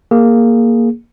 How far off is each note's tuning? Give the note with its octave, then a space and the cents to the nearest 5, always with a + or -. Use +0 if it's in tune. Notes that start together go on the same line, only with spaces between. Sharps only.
A#3 +0 G#4 +0